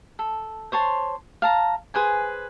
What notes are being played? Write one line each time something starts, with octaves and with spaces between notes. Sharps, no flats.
A4
C5 C#5 A5 C6
F5 A5 A#5
G#4 B4 C5 G#5